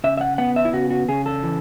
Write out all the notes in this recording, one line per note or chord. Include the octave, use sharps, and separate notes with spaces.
C#3 E5
E5
F#5
B3 F#5
E5
E4
C#3 F#4
F#4
C#3 G#4
A4
E3